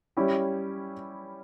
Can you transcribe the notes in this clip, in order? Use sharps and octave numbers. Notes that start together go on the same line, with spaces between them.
G3 C#4 E4 G4